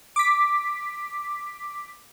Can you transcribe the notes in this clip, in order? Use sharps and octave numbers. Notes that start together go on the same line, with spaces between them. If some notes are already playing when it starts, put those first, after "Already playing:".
D6 B6